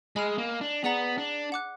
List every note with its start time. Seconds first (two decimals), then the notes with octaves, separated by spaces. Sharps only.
0.16 G#3 D#5 G#5 B5 F6
0.38 A#3
0.61 D4
0.84 B3 G#4 D5 F#5 A#5
1.18 D4
1.52 F#5 D6 F#6